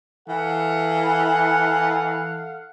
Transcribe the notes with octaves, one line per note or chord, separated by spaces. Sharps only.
E3 A4 F5 F#5